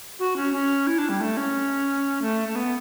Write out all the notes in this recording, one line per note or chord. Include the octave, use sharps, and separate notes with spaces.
F#4
C#4
C#4
E4
D4
G3
A3
C#4
A3
A3
B3